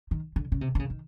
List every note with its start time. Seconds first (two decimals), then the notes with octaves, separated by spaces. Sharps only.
0.11 D#3
0.36 D3
0.52 C#3
0.61 C3
0.75 D3
0.79 C#3
0.90 D#3